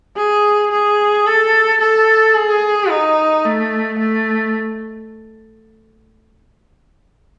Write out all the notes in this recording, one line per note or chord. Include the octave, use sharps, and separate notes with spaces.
G#4
G#4
A4
A4
G#4
D#4
A3
A3